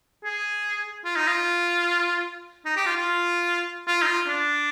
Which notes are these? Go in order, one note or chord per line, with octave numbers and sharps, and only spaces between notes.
G#4
F4
D#4
F4
D#4
G4
F4
F4
F4
D#4
F4
D4